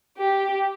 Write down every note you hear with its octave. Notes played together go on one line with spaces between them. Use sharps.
G4